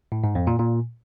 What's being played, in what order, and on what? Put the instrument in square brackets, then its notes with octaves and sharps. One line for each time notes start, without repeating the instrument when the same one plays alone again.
[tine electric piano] A2
G#2
F2
A#2
A#2